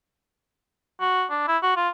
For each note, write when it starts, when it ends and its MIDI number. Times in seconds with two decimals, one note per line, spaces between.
1.01 1.25 66
1.30 1.43 62
1.48 1.58 64
1.63 1.73 66
1.76 1.89 65